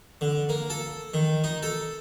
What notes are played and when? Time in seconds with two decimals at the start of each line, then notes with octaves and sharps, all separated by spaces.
0.21 D3
0.49 A#3
0.70 A4
1.14 D#3
1.44 D#4
1.63 A4